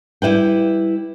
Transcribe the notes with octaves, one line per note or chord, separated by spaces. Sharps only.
G3 E4 B4 G5